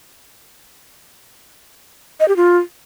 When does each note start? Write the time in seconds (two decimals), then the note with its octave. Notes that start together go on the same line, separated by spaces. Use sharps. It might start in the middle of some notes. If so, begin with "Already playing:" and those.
2.20 D#5
2.28 G4
2.36 F4